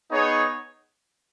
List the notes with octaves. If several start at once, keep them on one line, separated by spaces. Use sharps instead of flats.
B3 D#4 G#4 C#5